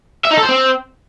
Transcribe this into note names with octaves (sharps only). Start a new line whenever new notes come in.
E5
D#4
A4
C5
C4